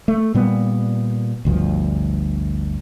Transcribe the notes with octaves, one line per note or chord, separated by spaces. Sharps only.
A3
A#2 G3 B3
G1 D2 G2 F3